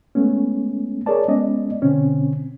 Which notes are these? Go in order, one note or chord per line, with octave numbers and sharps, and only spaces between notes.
G#3 A3 B3 C#4
G#4 A#4 C#5 D5 A5
G#3 B3 C#4 D5 D#5
B2 D3 C4 C#4